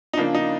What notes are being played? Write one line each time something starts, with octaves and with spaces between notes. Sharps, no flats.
D#4
C#3 F3 A#3 D4
D#4